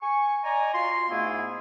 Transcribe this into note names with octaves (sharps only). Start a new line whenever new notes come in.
G#5 C#6
D5 D#5 G#5 A#5
F4 F#4 C6
G#2 A3 B3 E4 G#4